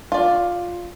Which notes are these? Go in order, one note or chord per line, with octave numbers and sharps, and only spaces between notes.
F4 D5